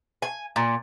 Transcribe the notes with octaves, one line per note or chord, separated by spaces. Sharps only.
G#5
A#2